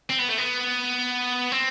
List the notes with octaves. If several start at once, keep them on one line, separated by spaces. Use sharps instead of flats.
C4
B3
A3
B3
C4